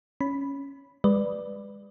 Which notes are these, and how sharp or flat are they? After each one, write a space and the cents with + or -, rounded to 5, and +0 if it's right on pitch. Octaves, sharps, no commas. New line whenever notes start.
C#4 +0 B5 +0
G#3 -30 B4 +0 D5 +5